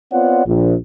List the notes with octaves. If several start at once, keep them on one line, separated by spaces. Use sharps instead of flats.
B3 C4 F4 C#5 D5 F#5
A#1